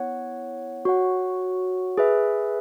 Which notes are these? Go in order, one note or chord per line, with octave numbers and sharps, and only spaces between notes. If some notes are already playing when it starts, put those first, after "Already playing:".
Already playing: B3 E4 C#5 F#5
F#4 C#5 F#5
G#4 B4 E5